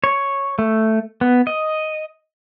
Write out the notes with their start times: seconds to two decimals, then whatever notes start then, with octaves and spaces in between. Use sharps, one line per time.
0.04 C#5
0.59 A3
1.21 B3
1.47 D#5